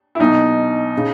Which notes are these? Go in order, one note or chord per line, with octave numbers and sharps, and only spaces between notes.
E4
B1 B2 D#4
C#3